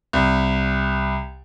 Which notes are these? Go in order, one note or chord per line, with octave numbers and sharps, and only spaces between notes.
C2